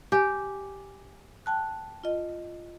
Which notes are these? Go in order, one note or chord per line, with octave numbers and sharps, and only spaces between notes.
G4 G#5 G6
G5 A5 F#6
F4 D#5